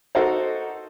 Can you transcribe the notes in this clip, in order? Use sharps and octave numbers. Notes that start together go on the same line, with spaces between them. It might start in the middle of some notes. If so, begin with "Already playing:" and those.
D#4 F#4 A4 A#4 C5